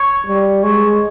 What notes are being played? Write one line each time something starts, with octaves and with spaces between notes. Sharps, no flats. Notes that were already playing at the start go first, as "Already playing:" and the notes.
Already playing: C#5
G3
G#3 C#5